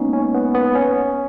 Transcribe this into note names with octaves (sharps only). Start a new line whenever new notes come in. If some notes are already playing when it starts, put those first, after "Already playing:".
Already playing: G#3 A#3 B3 C#4 D#4
C#4
B3
B3
C#4